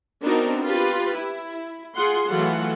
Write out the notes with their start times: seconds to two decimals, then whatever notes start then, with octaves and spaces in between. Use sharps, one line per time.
0.21 B3 C4 D4 D#4 F#4 A#4
0.63 F4 G4 B4
1.17 E4
1.95 F4 G#4 F#5 C6
2.27 E3 F#3 A3 F4 F#5